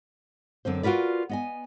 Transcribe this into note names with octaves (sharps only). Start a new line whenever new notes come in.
F#2 D3 C4 C5
F4 F#4 A#4 B4 D5
B3 D#5 G#5